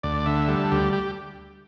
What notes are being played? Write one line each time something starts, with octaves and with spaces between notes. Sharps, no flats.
D2 D5
D3 E5
G3 A4
D2 G4
G4